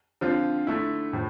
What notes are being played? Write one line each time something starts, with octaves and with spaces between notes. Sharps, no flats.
D3 F3 C4 F4
D3 A3 E4
A2 F3